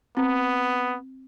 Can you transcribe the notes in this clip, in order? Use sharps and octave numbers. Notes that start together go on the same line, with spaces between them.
B3 C4